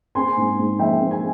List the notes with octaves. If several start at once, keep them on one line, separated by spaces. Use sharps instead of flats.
C4 G#5 C6
G#2
G#2
F3 E5 G5
C4
G#5